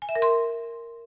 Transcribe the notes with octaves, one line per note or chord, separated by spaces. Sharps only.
G#5
E5
A#4
C6